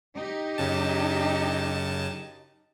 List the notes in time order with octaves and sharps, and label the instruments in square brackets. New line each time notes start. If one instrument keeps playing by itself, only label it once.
[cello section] D#4 G4
[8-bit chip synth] F#2 C#3 A5